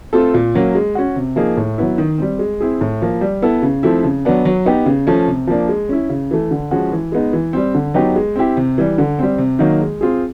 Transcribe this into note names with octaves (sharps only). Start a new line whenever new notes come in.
A3 C4 F4 A4
A#2
F#3 A#3 C#4
G#3
C#4 F#4
C3
F3 A#3 D#4 G#4
A2
F#3 B3 E4
D#3
G3 C4
G#3
C4 E4 G#4
A2
F3 A#3
G3
B3 E4 A4
C#3
F3 A3 C4 E4
C#3
F#3 B3 D4
F#3
B3 D#4 G4
C#3
F3 A3 C#4
C3
F3 A#3 D4
G#3
C#4 E4
C#3
E3 A3
D3
F3 G#3 C#4 F#4
E3
G#3 B3 D#4
E3
G3 C4
D3
F#3 B3 D#4 G4
G#3
C4 E4 G4
C3
E3 G3
D3
G3 C4
C3
D#3 F#3 A#3 D#4
G#3
C4 F4 G#4